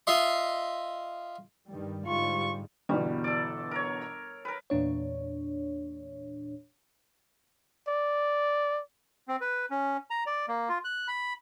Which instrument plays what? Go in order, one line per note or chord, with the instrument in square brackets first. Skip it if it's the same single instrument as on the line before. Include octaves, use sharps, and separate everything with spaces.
[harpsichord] F4 D#5 E5 C6
[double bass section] G2 D#3 G3
[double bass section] G#2 D3 G3 [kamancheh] F4 C#6
[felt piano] G1 B2 E3 [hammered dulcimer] G3
[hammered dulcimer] A4 D5
A#4 C#5
A#4 B4
[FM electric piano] E2 A#2 D4 C#5
[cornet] D5
[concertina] C4
B4
C#4
A#5
D5
A#3
F4
F#6
B5